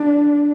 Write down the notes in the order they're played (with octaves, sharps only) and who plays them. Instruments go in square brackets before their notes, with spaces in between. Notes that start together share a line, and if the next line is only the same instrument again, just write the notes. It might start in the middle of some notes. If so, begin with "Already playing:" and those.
Already playing: [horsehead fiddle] D4